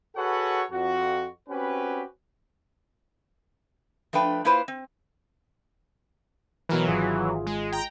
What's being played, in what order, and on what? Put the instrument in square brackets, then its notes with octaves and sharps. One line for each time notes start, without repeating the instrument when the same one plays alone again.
[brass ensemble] F#4 G#4 A4 B4 C#5 F#5
F2 F#4
C4 C#4 F#4 G4 B4
[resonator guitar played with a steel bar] F3 A3 D4 B4 G5
A#3 E4 F4 B4 C5
C4
[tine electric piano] B2 A#4 B4 [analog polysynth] E3 F#3
[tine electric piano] G#1 F4 G#4
[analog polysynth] G#3
G5 A#5